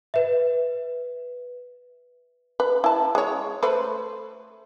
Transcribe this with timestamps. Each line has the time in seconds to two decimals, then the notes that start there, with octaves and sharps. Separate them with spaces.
0.14 B4 E5
2.60 B4
2.84 E4 A5
3.15 G#3 C#5
3.63 A3 B4 C5